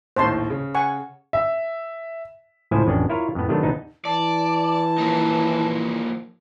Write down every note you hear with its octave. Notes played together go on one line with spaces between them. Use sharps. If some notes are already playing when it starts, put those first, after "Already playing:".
A#1 D#2 A2 C5 A5 C6
C#3
F#5 G#5 C#6
E5
C#2 A2 F3 E4 C5 G#5
A1 F2 B3 C#4 D4
E4 F4 A#4 C#5 F5
F2 A2 B3
C3 D#3 F#3 A3 B3 D4
D#2 B3 D4 D#4
E3 D5 A5
F3 A#3 D#4